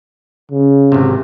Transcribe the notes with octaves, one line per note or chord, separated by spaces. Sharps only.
C#3
G#1 C3